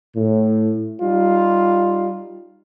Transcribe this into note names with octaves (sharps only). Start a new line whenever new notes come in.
A2
G3 D#4 F4